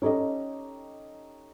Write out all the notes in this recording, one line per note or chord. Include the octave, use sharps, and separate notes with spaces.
C#4 D#4 G4 A4 D#5